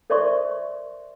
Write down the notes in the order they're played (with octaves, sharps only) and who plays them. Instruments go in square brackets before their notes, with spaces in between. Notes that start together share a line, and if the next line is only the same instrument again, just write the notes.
[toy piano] A#4 C5 D5 E5 C6 C#6